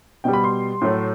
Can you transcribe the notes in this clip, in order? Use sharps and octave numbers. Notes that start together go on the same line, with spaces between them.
B2 G3 G5
B5
C6
A2 F#3 A3